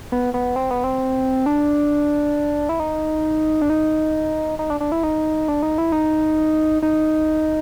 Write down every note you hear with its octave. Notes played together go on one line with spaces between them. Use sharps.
B3
B3
C4
B3
C4
D4
E4
D#4
D4
D#4
D#4
D4
D4
E4
D#4
D4
D#4
E4
D#4
D#4